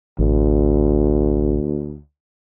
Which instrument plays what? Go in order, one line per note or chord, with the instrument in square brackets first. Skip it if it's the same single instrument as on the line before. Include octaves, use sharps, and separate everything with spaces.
[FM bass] A1 [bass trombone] D2